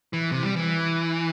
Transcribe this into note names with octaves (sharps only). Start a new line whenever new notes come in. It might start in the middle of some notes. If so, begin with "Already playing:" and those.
E3
C3
G3
E3